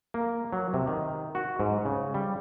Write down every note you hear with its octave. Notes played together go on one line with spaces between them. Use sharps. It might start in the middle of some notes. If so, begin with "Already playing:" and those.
A#3
F#3
C3
D#3
F#4
G#2
C#3
G3